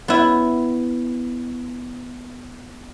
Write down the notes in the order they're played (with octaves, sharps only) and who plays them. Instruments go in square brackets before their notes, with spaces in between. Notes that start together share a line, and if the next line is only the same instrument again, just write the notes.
[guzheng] B3 E4